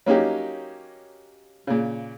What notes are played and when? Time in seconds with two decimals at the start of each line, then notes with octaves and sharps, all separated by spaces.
0.06 F#3 A#3 C#4 D#4 G4
1.67 A#2 C#3